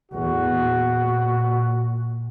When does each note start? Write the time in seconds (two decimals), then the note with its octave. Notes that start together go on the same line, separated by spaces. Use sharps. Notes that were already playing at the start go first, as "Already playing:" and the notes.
0.12 E2 A2 F#4
0.49 A#2